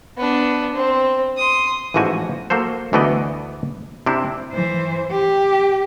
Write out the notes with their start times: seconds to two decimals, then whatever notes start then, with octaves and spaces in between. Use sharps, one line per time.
0.17 B3 D4
0.75 C4
1.37 C6 D#6
1.94 A1 G#2 E3 F3 F#4 G#5
2.50 A#3 F#4 A4 C5
2.93 D2 E3 A3 B3 D5 D#5
4.06 C3 C4 D4 E4
4.52 E3 C5
5.11 G4